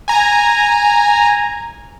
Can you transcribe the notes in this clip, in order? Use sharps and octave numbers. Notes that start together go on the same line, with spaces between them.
G#5 A#5